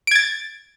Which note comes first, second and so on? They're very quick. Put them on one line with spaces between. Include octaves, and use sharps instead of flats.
D7 G#6 A6